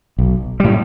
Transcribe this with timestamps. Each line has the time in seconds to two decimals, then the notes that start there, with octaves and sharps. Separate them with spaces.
0.18 B1
0.60 A2 G3